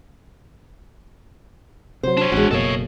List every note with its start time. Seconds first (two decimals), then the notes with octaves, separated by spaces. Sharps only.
2.03 C3 F#3 C5
2.17 D4 C#5
2.32 A1 E2 G#3 F#4
2.51 F#1 B2 A#3 A4 C#5 D#5